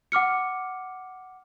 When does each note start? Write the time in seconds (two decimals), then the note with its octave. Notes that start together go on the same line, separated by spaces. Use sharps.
0.12 F#5 D6 F6 C#7